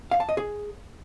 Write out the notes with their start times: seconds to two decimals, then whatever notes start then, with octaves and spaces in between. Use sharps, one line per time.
0.11 F5
0.20 A5
0.29 D#5
0.37 G#4